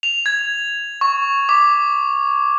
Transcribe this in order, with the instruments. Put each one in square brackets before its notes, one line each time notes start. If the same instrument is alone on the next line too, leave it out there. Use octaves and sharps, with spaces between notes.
[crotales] F7
G#6
C#6
D6